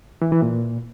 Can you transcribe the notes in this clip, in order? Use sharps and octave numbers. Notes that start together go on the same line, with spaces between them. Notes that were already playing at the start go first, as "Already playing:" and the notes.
E3
E3
A#2